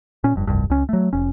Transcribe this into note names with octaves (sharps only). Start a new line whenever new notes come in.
A#2 C#4
F1 G2
F1 C2 G2
C#2 C#4
F#3 A3
F1 C#4